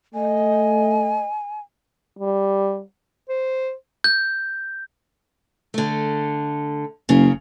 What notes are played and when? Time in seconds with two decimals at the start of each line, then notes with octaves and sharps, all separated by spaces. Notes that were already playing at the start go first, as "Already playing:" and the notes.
0.14 A3 D#5 G#5
2.19 G3
3.29 C5
4.04 G6
5.74 D3 A3
7.09 F#1 C#3 A#3